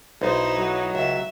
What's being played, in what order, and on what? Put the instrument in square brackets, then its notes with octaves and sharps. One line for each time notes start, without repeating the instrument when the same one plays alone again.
[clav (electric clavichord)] B1 [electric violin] D#4 E4 [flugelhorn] C5
[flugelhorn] F#3
[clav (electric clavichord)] C#2 [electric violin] E5